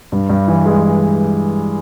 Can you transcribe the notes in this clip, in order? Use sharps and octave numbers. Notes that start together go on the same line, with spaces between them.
G2
G2
E3
G#3